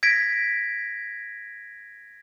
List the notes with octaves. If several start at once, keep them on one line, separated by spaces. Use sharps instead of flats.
G#6 A#6 B6 D7